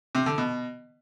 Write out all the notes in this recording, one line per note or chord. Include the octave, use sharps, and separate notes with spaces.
C3
D3
B2